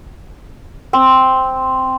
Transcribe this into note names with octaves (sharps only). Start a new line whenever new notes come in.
C4